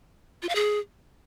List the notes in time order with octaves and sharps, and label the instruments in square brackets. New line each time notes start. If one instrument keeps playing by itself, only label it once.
[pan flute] F4
F5
G#4